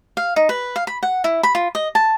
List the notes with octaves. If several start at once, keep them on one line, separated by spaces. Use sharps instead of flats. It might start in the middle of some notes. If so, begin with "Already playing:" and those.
F5
D#4
B4
F5
B5
F#5
E4
B5
F4
D#5
A5